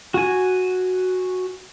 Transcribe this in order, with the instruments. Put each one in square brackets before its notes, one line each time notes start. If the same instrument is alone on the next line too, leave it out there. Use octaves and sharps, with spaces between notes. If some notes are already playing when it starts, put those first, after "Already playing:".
[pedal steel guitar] F#4 G#5